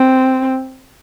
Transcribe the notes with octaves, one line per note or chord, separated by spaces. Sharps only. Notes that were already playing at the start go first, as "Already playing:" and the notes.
Already playing: C4